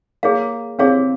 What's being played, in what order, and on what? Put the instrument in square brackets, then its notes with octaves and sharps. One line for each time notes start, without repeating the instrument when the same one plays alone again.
[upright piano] A#3 [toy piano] G#4 C#5 F5
[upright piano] C4 [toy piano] G#4 C#5 F5